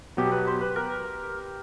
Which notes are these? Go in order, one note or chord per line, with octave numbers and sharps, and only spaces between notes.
B2 F#3 B3 G4
B4
C5
B4
A#4